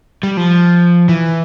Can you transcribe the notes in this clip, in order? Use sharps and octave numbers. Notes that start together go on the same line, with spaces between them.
G3
F3
E3